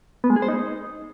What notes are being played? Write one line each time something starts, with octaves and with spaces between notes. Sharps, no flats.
B3
G#3
G#4
C5
D#4